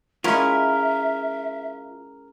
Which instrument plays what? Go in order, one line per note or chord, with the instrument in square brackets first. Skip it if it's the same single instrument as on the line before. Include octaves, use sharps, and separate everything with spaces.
[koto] G#3 C#4 E4 [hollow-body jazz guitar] F4 [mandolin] A#4 [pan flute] E5